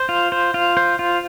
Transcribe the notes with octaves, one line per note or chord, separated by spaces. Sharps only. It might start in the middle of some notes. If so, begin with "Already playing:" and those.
Already playing: C5
F4
C5
F4
C5
F4